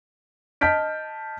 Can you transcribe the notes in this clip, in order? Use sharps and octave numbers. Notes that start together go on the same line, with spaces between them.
D#5 A5 F6 G6 B6 D7